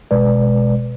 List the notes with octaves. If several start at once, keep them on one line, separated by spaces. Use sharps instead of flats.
G1 B2 G#3 B4 D5